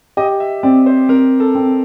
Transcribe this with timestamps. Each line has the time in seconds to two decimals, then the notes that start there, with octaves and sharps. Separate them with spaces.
0.17 G4 D#5
0.40 E5
0.63 C4 D5
0.86 C5
1.09 C4 A#4
1.40 A4
1.55 C4